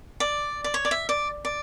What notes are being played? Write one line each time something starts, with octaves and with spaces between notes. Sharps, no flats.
D5
D5
C#5
D5
E5
D5
D5